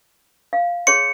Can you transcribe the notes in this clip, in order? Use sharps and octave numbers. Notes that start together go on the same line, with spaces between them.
F5
G#4 C#5 C6 C#7